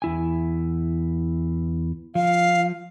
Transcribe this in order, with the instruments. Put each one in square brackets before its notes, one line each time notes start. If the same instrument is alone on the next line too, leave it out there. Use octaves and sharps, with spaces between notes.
[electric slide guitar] E2 E4 G#5
[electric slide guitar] F3 [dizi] F5